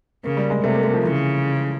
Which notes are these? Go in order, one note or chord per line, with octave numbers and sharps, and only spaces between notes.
C#3 A#3
G3
G#3
C3 A3
A#3
A3
F3
C#3 E3